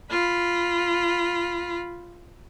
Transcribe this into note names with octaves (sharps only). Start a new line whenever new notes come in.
F4 B5